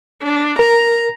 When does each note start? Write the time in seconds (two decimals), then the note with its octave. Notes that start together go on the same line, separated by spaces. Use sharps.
0.23 D4
0.59 A#4 A#5